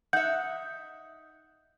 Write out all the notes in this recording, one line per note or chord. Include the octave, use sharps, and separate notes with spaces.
D#4 E5 F#5 G6